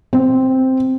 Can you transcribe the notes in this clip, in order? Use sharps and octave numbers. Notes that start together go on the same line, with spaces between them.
C4